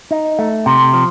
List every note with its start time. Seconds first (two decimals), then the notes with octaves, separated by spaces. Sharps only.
0.11 D#4
0.39 A3
0.66 C3
0.93 F3